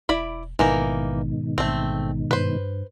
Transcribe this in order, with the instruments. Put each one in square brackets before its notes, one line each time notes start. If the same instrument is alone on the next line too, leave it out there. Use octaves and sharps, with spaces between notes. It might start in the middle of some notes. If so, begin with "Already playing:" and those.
[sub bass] E1 [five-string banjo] E4 D5 B5
[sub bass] A1 [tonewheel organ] G#2 B2 D#3 [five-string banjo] E3 A#3 D#4
[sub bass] A1 [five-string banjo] A3 C4
[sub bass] G2 [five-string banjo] B4 C5